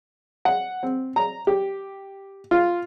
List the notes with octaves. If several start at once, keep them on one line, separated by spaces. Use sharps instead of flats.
F#5
C4
A#5
G4
F4